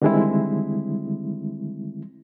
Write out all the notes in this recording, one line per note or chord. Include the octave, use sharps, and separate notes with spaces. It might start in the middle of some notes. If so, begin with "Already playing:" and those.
D3 D#3 G3 G#3 C4 E4